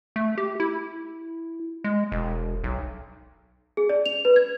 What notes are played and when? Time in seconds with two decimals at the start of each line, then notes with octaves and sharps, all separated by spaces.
0.16 A3
0.38 G4
0.60 E4
1.84 G#3
2.12 E1
2.64 B1
3.77 G#4
3.89 D5
4.06 F7
4.25 B4
4.36 G#6